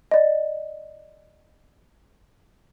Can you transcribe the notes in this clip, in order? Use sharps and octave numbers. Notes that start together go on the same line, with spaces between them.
D5 D#5